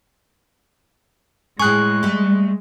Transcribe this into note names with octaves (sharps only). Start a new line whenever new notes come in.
A2 G#3 G#4 C#6 F#6
G3 A3